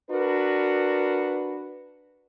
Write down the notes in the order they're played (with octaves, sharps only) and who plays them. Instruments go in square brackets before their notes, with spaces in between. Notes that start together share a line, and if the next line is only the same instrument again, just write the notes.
[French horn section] D4 F#4 A#4 B4